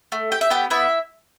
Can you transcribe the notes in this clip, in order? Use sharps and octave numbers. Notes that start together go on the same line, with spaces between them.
A3
G4 G5
E5
B3 G4 G5
B3 E4 E5